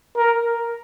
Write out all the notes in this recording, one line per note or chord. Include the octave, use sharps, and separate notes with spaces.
A#4